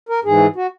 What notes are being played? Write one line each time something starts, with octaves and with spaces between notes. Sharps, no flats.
A#4
G#2 E3 G#4
F#4